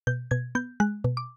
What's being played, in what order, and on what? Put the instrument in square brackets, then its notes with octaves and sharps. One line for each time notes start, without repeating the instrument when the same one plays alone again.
[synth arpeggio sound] B2 G6
B2 G#6
B3 G6
G#3 F#6
B2
D6